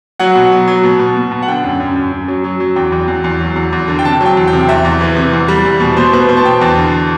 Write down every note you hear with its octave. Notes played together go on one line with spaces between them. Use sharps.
F#3 F#5
B2
F#3
F#3
B2
B2
B2
B2
F#5
D3 G5
F#2
F#2
F#2
F#2
F#3
F#3
F#3
E2 G5
E2
E2
E2
F#3
E2
E2
D3
G5
C3 A5
F#3
G5
E2
G5
C3
E2 E5
E2
E3
C3
E2
G3
E2
B2
B2 C5
B2 B4
B2 C5
A5
B2 G5
E2 A5
D3